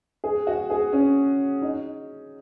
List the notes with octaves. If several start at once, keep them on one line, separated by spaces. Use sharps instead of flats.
G#4
F#4
G#4
C#4
D#4